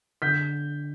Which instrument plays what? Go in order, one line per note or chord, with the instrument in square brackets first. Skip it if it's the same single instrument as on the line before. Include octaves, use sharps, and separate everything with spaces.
[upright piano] D3 G6 B6